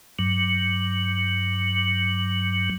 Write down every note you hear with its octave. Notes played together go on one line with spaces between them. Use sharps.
G2 F#3